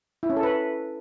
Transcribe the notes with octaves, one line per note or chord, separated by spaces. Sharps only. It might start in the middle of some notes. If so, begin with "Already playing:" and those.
E4
C#4
A4
B4